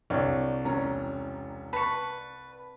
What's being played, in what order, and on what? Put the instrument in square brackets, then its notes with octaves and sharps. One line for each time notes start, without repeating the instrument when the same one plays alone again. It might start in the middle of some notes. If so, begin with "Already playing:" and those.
[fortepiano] C2 D4 [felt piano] C#5
[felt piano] E1 C#4 A#5
[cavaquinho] B4 C#6 [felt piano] A5